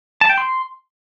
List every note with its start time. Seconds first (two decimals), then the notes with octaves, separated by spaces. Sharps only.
0.21 A5
0.29 G5
0.38 C6